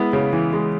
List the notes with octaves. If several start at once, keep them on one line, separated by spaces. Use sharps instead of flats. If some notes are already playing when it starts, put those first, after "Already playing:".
Already playing: G#3 B3 E4
C#3
E3
G#3